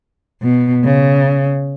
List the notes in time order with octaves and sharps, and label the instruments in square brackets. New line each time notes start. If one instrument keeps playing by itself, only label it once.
[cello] B2
C#3